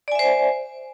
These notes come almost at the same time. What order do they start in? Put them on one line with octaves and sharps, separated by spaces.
D5 G#5 E5 C5